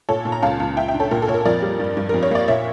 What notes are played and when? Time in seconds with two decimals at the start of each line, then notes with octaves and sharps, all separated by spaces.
0.09 A#2 A4 C#5
0.25 A#2
0.32 A#5
0.42 C#2 F5 A5
0.60 C#2
0.77 C#2 E5 G5
0.88 E5 G5
0.94 D4
1.00 A4 C#5
1.11 A#2 A#4
1.22 A4
1.28 A#2 C#5
1.34 A#4
1.45 F2 A#4 D5
1.62 G3
1.80 G2
1.97 G2
2.09 F2 A#4
2.23 C#5
2.31 A#3 D5
2.48 A#2 C#5 E5